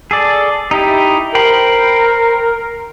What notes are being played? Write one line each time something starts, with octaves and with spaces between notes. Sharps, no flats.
G#4 A4 D5
D#4 E4 G4
A#4 C5 G5 B5